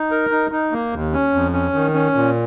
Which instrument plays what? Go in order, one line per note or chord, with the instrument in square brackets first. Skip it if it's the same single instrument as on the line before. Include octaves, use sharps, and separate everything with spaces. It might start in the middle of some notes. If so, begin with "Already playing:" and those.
Already playing: [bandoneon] D#4
A#4
D#4
D#4
A#3
D#2
C#4
F2
C#4
D#3
C#4
A#2